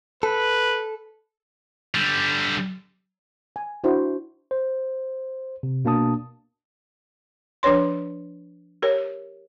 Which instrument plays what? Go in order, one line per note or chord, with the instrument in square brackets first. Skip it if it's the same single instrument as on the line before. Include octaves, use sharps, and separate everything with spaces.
[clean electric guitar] A4 [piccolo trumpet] B4
[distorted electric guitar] D3 G3
[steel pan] G#5
D4 E4 F#4 C5
[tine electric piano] C5
C3
B2 A#3 D4 A5 D#6
[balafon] F3 D4 B4 C#5 C6
G4 A#4 C#5